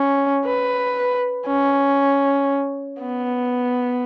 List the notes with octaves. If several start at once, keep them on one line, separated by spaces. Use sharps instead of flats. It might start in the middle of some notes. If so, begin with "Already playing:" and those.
Already playing: C#4
B4
C#4
B3